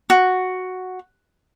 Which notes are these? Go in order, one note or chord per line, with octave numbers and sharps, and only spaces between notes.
F#4